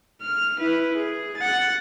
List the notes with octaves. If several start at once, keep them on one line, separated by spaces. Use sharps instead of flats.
F6
E4 B4
G#4
F#5 A6